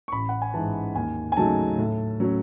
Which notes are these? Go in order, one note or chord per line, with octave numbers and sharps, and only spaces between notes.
C#6
A1 B5
F#5
G#5
G#2 E3 A5
D#2 G#5
G#5
C#3 F#3 A3 D#4 A5
A2
F#3 A3 C#4